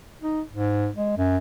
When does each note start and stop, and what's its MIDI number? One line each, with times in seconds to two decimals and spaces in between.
0.22 0.41 63
0.53 0.89 44
0.96 1.14 56
1.17 1.38 42